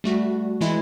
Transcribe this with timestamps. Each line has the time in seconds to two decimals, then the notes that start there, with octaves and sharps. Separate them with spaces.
0.04 G3 A3 F#4
0.61 E3 G#3 E4